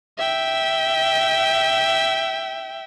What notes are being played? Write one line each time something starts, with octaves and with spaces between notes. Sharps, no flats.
E5 G5